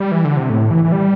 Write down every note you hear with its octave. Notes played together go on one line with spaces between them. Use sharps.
G3
E3
D3
C3
A2
E3
E3
G3